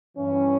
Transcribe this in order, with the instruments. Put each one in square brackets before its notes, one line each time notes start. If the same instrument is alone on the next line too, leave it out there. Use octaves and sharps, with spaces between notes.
[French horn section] G2 E3 C#4